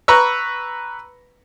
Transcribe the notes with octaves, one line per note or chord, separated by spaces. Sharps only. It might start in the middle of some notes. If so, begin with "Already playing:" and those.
B4 A#5 B5 C#6 E6